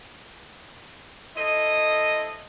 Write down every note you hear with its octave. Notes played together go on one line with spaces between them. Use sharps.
E4 A4 C5 D#5